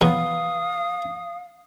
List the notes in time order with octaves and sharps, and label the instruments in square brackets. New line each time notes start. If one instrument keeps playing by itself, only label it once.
[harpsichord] E2 B2 F#3 [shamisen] B3 [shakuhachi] F5 [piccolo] D#6